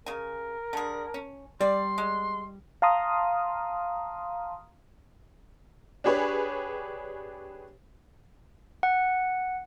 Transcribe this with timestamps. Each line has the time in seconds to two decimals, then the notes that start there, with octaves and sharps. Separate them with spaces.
0.06 C#3 A#4 G#5
0.73 D3 G#4
1.14 C#4
1.61 G3 D5 C6
1.98 G#3
2.82 F5 A5 A#5 C6 D#6 F6
6.04 D4 G4 G#4 B4 C#5
8.83 F#5